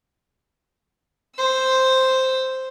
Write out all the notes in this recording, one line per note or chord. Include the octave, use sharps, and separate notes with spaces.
C5 E6